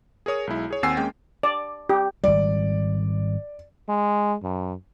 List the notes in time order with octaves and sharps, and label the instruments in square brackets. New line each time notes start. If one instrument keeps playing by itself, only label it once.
[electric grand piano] G#4 A#4 C#5 D#6
B1 G#3 E4
G#4 C#5
D#2 C4 F#5 G#5 E6 C7
G#3 A#3 C#4 G5
[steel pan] D5
G4
[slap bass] G#1 G3 [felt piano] D5
[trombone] G#3
F#2